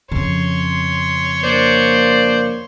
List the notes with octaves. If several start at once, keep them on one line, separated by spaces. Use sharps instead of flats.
F2 C#3 C#5 C6
A#3 D4 C5 D5